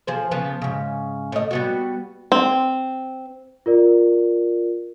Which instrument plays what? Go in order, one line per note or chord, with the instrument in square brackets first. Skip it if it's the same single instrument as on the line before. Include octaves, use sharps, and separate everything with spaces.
[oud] F3 G#4 C5
C#3 F3 B3
G#2 C#3
A2 D#5
G3 B3 F#4
[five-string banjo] C4
[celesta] F4 A#4 D5